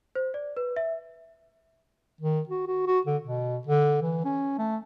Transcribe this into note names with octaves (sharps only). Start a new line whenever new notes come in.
C5
D5
B4
E5
D#3
F#4
F#4
F#4
D3
B2
D3
E3
C#4
A3